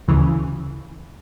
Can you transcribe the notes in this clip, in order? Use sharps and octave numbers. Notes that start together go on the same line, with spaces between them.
D2 C#3 E3